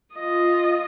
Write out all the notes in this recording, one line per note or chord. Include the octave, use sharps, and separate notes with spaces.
F4 D#5